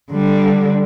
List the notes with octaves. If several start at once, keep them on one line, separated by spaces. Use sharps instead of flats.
D3 G3